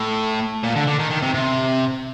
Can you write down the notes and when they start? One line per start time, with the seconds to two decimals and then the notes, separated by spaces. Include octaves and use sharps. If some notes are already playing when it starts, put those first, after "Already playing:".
Already playing: A2
0.63 A#2
0.76 D3
0.87 D3
0.99 D#3
1.10 D#3
1.22 C3
1.34 C3